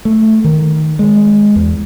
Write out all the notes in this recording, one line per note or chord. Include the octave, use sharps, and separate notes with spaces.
A3
D#3
G#3
E2